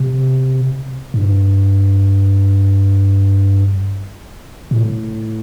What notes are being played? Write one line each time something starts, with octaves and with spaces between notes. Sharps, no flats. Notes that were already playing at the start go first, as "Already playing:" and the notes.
Already playing: C3
G2
A2